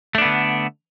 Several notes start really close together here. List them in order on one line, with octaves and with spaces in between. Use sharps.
A3 D4 B3 D3